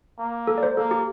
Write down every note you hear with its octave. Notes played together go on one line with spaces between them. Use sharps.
A#3
A4
D5
C5
A#3 A4
G4